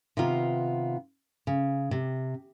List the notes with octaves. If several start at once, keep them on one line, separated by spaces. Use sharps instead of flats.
C3 D#3 B3 F4 A#5
C#3
C3